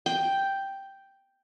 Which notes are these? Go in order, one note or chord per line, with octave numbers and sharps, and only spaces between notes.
G5